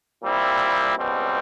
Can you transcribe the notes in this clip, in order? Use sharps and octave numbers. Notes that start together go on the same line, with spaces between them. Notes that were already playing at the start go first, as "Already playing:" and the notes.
A#2 G3 C4 E4
C#2 B2 G3 C4